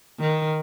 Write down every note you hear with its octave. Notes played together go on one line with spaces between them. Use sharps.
D#3